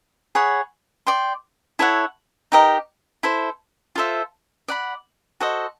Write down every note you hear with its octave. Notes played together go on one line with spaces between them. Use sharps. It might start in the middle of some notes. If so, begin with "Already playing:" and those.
G#4 C#5 F#5 B5
D5 G5 C6
E4 A4 C#5 F#5
D#4 G4 A#4 D#5
E4 A4 C5
F4 A4 C5 E5
D5 F#5 B5
F#4 A4 C5 D#5